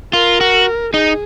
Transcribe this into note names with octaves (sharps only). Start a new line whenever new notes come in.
F4 A#4
F#4
D#4 G#4